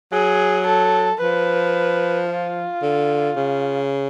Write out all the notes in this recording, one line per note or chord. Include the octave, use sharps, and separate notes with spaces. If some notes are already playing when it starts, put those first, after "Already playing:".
F#3 G#4
A4
F3 B4
F4
D3
C#3